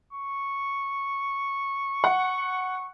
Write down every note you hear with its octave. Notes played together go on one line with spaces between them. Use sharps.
C#6
F#5